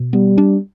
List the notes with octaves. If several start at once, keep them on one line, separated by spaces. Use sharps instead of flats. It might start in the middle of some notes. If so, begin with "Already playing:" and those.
Already playing: B2
G3 B3
D4